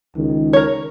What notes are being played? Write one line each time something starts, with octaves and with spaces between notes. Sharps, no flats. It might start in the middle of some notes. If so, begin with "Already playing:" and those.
C#2 D#3
A#4 C#5